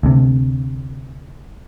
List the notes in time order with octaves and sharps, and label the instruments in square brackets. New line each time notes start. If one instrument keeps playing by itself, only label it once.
[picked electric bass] D2 C3